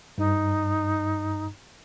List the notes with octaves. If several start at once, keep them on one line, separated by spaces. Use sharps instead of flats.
G2 D#4